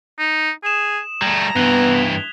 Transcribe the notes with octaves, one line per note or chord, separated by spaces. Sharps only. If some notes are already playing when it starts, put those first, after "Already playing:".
D#4
G#4 D#6 E7
G3 A3 A#5 G#6
G2 E3 B3 F#6 F7 G7
B6